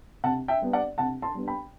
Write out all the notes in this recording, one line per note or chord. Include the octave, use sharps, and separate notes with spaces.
C3 F#5 A5
E5 G5
G3 B3 D4
D5 F#5
C3 F#5 A5
A5 C6
G3 B3 D4
G5 B5